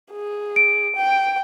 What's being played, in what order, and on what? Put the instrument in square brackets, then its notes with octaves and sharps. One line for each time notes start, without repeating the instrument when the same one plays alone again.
[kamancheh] G#4
[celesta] D7
[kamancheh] G5